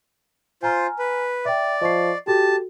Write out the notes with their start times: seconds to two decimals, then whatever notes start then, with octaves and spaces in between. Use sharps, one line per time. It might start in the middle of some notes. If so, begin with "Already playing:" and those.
0.63 F4 C5 G#5 A#5 F6
0.99 B4
1.45 D5 E5 G5
1.81 F3 D#5 C#6 C7
2.27 F#4 G4 A4 A5